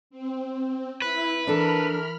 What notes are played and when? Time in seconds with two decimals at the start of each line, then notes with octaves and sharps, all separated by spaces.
0.10 C4
1.02 E4 B4
1.47 E3 D4 A4 A#4 B5 F6